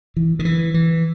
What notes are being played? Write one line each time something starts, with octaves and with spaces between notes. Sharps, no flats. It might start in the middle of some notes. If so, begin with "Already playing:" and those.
E3
D#3
E3
E3